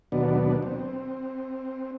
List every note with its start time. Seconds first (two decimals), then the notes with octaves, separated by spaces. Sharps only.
0.12 D#2 B2 F#3 B3 D4
0.62 C4